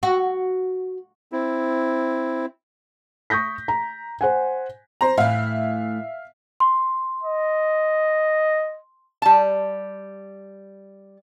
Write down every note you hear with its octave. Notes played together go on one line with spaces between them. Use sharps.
F#4
C4 E4
C#6 D#6 G6 A#6 B6
A#5
C5 F#5 G#5
C5 A#5
A2 E3 E5 F5
C6
D#5
G3 A5